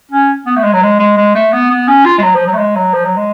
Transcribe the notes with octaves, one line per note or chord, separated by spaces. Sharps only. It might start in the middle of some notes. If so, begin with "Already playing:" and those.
C#4
B3
A3
G#3
F#3
G#3
G#3
G#3
A3
B3
B3
C#4
F4
G#3
F#3
F3
F#3
A3
G#3
F#3
F3
F#3
G#3